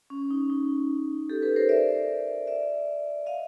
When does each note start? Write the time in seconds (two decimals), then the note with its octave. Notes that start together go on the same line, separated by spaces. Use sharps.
0.10 C#4
0.31 D#4
0.50 D#4
1.30 G4 A4
1.42 A4 B4
1.56 A#4 C5
1.69 D5 E5
2.47 D5 E5
3.26 D#5 F5